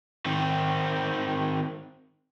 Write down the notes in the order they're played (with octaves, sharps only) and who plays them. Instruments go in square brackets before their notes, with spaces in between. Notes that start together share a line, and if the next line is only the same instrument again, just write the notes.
[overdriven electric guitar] D#3 C4